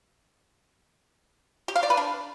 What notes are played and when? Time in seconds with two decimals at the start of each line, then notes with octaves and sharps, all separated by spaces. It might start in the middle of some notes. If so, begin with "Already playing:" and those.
1.68 G4
1.76 F5
1.83 D5
1.90 B4
1.97 D4